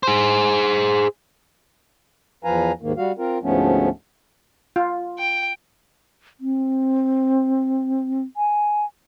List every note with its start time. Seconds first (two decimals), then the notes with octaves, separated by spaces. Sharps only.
0.03 G#4 C5
2.44 E2 F3 B4 F5 G#5 A#5
2.82 D#2 G#2 D#3 A#3
2.97 G3 F#4 F5
3.18 C4 F4 A#4
3.43 D2 G#2 F3 A3 B3 C#4
4.76 F4
5.19 G5
6.40 C4
8.37 G#5